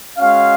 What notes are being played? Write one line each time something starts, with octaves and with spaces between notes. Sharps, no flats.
G#3 C#4 F#4 F5